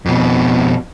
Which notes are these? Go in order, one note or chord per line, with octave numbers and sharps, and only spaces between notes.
F2 B2